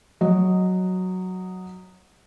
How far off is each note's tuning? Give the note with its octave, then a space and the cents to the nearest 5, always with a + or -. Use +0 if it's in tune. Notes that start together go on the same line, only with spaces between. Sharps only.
F#3 +0 D#5 +0